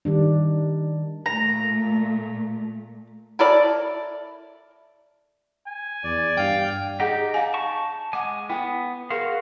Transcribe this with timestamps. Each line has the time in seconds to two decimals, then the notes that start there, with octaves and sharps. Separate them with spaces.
0.05 D#3 G3 D4
1.26 A#2 A3 A#5
3.39 E4 A4 A#4 D5
5.67 G#5
6.04 E2 D5
6.38 G2 F5 G5
7.00 D#4 G4 G#4 F#5
7.34 F5 F#5 G#5
7.54 A5 C#6
8.13 G#3 F#5 G#5 D6
8.49 B3 E4 G5
9.10 F#4 G#4 A#4 F5 C6